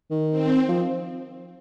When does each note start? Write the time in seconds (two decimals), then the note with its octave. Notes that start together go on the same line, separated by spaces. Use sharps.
0.11 D#3
0.30 C4
0.69 F3